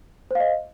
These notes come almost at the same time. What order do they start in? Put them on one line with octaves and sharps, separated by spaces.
C5 F5 D#5